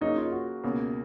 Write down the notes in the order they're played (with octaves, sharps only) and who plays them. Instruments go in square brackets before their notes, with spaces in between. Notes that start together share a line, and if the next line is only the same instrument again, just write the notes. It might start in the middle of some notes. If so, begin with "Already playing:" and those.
[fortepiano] C#3 F#3 A#3 [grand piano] D#4
[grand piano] F4
F#4
[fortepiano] C#2 B2 A#3